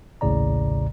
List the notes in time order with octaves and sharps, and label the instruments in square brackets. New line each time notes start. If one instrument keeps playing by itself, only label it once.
[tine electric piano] A#1 D#2 A2 C#3 D5 A#5